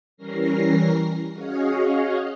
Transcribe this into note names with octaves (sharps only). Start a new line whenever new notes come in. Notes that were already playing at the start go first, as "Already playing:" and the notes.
E3 G3 C#4 A#4 A#6 C7
C#4 F#4 G#4 C#5 D#5 F5